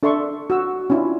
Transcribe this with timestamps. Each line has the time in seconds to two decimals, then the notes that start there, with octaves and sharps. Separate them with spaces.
0.03 D4 A4 E5 C6 C#6
0.50 F#4 E6
0.90 C#4 D4 E4 F4